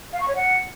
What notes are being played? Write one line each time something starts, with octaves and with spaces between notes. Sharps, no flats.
F5
C#6
C#5
F#5